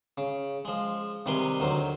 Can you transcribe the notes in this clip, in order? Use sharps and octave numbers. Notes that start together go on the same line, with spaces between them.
C#3
F3 G#3
C3 D#3 G3 B4 G#5 C6
D2 D#3 F#3 C5